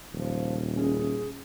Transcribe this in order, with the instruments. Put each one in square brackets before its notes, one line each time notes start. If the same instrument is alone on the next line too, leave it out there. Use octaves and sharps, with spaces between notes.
[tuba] D#1 [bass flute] F3
[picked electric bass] C#4 [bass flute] G#4